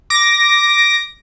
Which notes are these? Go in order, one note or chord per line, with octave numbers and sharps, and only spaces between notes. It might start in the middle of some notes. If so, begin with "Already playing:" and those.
D6 A#6